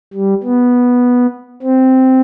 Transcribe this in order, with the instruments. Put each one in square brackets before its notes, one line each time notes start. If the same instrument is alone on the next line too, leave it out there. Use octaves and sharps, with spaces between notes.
[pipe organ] G3
B3
C4